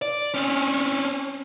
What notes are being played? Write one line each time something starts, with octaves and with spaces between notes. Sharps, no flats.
D5
C4 C#4